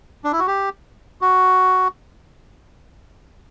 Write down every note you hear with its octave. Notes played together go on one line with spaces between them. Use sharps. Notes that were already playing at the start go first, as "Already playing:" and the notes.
D4
E4
F#4
G4
F#4